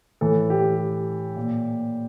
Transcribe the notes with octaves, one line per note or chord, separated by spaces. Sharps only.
A2 E3 A4
G4
A#2